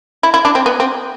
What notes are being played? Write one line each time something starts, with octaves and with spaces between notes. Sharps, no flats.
E4
E4
D4
C4
B3
C4